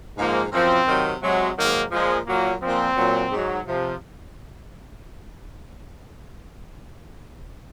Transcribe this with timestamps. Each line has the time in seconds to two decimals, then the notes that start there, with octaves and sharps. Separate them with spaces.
0.17 G#2 F3 A#3
0.52 F#2 F3 C4
0.87 C3 D#3 F#3
1.22 C3 F#3 G#3
1.57 G#2 D#3 F#3 A#3
1.92 A#2 F3 G#3
2.27 A#2 F#3 A#3
2.62 A#2 F3 C4
2.97 A#2 F#3
3.31 G#2 F#3
3.66 C3 F3